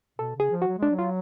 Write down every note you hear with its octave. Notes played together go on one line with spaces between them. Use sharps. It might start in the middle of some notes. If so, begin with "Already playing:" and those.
B2 A4
C#3 G#4
F3
F#4
F#3
G#3 D4
F#3
F4